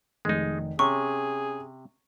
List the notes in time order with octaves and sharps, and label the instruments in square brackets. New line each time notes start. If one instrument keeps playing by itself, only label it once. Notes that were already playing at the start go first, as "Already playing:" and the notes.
[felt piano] F1 D#3 [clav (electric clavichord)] G#3 D#4
[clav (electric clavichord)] C3 [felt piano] C#4 [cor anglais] G#4 [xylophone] C#6